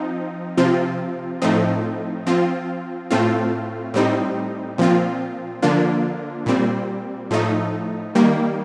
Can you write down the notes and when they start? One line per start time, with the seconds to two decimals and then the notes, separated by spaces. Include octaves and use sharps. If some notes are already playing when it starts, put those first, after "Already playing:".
Already playing: F3 C4 D#4
0.57 C3 F3 C4 F4
1.42 A2 F3 A3 C4 D#4
2.26 F3 C4 F4
3.11 A2 A3 C4 F4
3.94 A2 G3 C4 D#4
4.78 A#2 F3 C4 F4
5.62 D3 F3 A#3 D4 F4
6.46 A#2 G3 C4
7.31 A2 F3 A3 D#4
8.15 D#3 G3 A#3